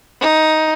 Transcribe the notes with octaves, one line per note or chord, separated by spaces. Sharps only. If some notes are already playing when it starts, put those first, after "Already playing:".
D#4